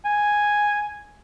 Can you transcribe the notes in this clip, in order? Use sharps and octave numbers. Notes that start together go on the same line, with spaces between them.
G#5